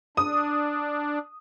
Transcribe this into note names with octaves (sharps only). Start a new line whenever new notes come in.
D4 D#6